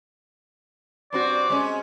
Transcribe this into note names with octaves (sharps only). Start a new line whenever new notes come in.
G2 C4 F#4 D5
G#3 C#4